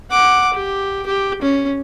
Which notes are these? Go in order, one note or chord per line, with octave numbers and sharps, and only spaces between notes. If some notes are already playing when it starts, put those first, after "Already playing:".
F#5 D6
G4
G4
C#4